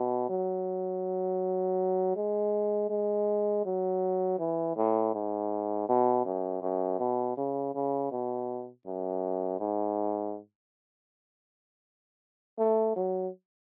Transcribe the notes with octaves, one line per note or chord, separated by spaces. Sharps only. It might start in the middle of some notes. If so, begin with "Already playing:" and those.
Already playing: B2
F#3
G#3
G#3
F#3
E3
A2
G#2
B2
F#2
F#2
B2
C#3
C#3
B2
F#2
G#2
A3
F#3